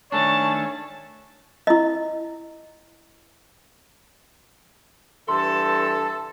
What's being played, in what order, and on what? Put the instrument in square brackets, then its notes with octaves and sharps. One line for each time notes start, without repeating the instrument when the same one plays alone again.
[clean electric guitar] D#3 A3 D4 [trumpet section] C#4 C#5 [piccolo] A5
[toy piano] E4 D#5
[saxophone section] G2 E3 A4 [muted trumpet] A5 [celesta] C6